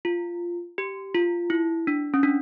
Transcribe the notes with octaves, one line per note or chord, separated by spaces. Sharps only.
F4
G4
F4
E4
D4
C#4
D4